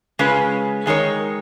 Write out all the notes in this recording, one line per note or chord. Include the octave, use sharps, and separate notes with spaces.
C#3 G#3 C#4 F4 B4
D#3 G#3 D#4 A#4 C#5